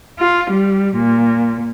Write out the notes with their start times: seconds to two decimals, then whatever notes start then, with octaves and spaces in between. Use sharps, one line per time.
0.19 F4
0.51 G3
0.96 A#2